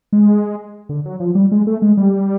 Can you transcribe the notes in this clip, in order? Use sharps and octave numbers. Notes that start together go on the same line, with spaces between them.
G#3
D3
F#3
F3
G3
G#3
A3
G#3
G3